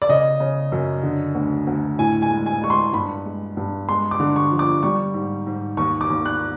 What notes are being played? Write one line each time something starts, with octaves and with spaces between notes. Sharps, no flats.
D5
C#3 D#5
C#3
F#2
D3
D2
D2
A2 G#5
G#5
G#3
G#5
G#3 C#6
C6
G2 B5
G#3
G2
G#3 C6
D6
D3
C#6
F3
D6
G3 C#6
G#2
G#2
D#2 C#6
D6
D#2
F#6